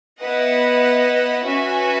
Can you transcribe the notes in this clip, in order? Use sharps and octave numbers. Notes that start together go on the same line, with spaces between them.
B3 E4 B4 D#5 F#5
C#4 F#4 B4 E5 G#5